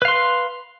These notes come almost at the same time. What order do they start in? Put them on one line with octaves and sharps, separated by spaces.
B4 F5 C6